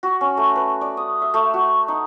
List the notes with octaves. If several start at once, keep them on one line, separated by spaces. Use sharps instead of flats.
F#4
C#4
A3
B4
D5
D#6
E5
A3
F#4
D#4